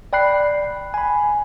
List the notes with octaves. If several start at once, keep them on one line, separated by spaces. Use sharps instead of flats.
D5 G5 B5 F#6 C7
G#5 B5